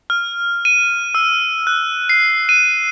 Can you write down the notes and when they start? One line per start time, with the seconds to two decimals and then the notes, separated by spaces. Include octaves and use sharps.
0.10 F6
0.65 D#7
1.15 E6
1.67 F#6
2.10 C7
2.49 D#7